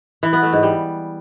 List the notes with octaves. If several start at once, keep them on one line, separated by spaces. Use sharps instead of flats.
E3
B3
A3
G#2
G3